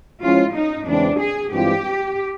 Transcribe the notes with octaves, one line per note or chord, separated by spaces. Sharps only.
F3 G#3 C#4 E4 F4
D#4
E2 C#3 E3 G#3 C4 D4
G#4
G2 E3 G#3 C4 F4 G4